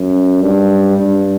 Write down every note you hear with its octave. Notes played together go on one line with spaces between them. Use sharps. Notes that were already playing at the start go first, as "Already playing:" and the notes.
Already playing: F#2
G2
G2